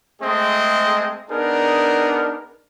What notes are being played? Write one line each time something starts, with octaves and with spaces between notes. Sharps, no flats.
G#3 A3 C4 G#4 D#5
B3 D4 D#4 G#4 A#4